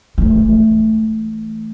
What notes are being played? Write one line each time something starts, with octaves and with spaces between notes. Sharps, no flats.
E3 A3